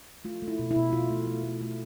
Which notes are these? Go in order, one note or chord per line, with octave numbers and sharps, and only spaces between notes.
A3 F4
A3
E4
B2
E4
B2
B2 F4
A3
A3
A3
A3